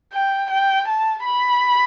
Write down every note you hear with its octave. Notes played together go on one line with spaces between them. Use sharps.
G5
G5
A5
B5